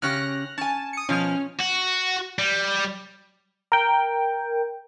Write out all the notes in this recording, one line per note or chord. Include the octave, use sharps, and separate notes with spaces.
C#3 C#4 G4 F6 F#6 A#6
C#4 G#5 A5
D#6 C#7
B2 F3 C#4 F6
F#4
G3
A#4 G5